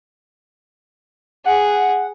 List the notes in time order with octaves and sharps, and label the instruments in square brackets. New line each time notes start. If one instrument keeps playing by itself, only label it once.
[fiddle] G#4 [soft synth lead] F#5